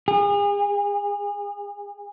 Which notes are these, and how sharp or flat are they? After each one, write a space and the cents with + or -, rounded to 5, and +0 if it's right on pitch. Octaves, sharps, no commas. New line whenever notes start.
G#4 -35